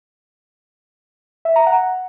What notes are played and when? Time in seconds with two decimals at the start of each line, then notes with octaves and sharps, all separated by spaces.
1.45 E5
1.56 A#5
1.66 F#5